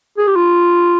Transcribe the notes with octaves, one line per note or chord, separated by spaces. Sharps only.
G#4
G4
F4